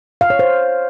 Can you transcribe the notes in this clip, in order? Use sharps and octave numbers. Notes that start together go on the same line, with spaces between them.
F5
C#5
C5